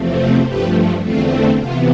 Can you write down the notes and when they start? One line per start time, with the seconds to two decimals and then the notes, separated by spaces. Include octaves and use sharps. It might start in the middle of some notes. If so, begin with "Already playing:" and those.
Already playing: E2 C3 F3 A3 C4
0.46 G2 F3 A3 G4 B4
1.02 E2 D3 A3 C4 F4
1.57 C3 E3 B3 F4